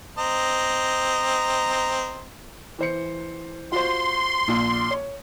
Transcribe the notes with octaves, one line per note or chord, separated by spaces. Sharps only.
C4 D#5 A#5
E3 C5 C#7
F4 F#4 C5 C6
A#1 A#2
C#5